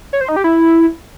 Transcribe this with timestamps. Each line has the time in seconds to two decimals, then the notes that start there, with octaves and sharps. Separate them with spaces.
0.13 C#5
0.21 C5
0.29 D#4
0.36 G4
0.44 E4